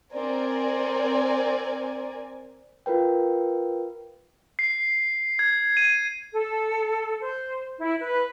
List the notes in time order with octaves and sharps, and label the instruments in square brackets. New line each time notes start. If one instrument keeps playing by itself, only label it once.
[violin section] C4 A#4 D5 G#5
[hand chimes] F4 A#4 B4 G5
[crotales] C7
G#6
D#7
[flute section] A4
C5
E4
B4